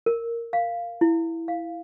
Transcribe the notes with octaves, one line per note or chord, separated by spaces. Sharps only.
A#4
F5
E4
F5